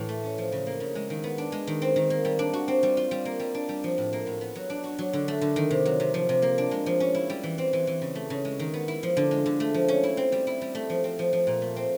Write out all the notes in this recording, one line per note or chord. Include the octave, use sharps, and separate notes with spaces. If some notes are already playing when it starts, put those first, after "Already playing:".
Already playing: A2 E3
A3
C#4
F3
C#3
A#3
C#3
G#3
D#3
B3
D4
G#3
D#3
C4
D#3
A#3
G3
D4
F#4
C4
G3
F4
G3
A#3
G3
D4
G3
F3
A2
A#3
A2
B3
F#3
D4
F#4
F#3
D3
A3
D3
D#3
C3
F#3
C3
F3
C3
A#3
D4
G#3
F3
C#4
E4
G3
E3
C4
E3
E3
C#3
A3
C#3
G#3
D#3
B3
E4
F3
D3
G#3
D3
A3
F3
C#4
E4
C4
G3
E4
G3
A3
F3
C4
F3
F3
A#2
A3
C4